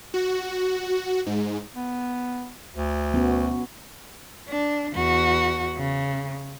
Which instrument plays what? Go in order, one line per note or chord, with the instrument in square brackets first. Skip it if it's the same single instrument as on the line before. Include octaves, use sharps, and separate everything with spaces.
[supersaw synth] F#4
G#2
[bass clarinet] B3
D2
[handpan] B3 C#4 F#4
[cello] D4
E2 F#4
C#3